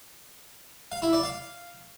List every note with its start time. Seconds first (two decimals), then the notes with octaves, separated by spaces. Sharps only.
0.92 F5
1.02 E4
1.13 D5
1.23 F5